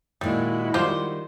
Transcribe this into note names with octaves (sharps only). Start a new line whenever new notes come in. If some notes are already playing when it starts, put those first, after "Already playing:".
A#2 D#3 G3 G#3 E4 F#4
D#3 G3 F4 G4 C5